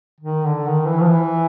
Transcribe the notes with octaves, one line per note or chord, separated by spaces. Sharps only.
D#3
D3
D#3
E3
F3
E3